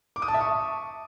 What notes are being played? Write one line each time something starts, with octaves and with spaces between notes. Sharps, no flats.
D6
D#6
A5
E5
C#6